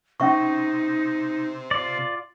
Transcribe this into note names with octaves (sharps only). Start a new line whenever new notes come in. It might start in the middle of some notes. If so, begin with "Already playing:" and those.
C3 C#4 D#4 E5 C#6
F4 D5